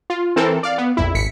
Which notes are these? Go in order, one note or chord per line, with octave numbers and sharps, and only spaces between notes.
F4
E3 C4 A4 A#4
D5 F5
B3
A#1 F2 E4
G#1 B6 C#7